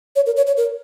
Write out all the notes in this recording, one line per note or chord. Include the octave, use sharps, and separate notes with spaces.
C#5
A#4
C#5
C#5
A#4